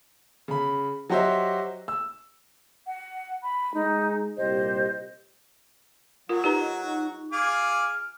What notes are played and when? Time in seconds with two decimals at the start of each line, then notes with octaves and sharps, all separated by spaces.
0.48 C#3 B5
1.10 F#3 F#4 G4 C5 D#5 E5
1.88 E6
2.85 F#5
3.42 B5
3.74 G#3 D#4
4.37 C2 A#2 G4 C5 D#5
6.29 F#3 F4 F#4 A#4
6.44 D#4 G4 B4 A#5
7.32 F4 G#4 D6 F6